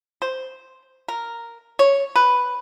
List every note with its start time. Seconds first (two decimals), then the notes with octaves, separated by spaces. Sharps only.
0.22 C5
1.08 A#4
1.79 C#5
2.16 B4